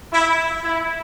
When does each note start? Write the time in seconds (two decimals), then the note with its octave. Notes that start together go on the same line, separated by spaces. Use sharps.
0.13 E4
0.64 E4